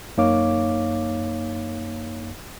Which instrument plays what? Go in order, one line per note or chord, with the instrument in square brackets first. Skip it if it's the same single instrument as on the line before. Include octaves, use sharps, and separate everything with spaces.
[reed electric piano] F#2 A#3 D#4 C#5 F5 D6